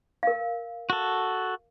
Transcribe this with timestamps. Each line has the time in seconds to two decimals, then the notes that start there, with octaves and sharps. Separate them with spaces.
0.23 A#4 F5
0.90 F#4 A4